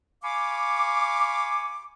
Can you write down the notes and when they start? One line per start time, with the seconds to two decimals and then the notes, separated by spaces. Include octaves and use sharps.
0.23 F5 G#5 B5 C#6 D6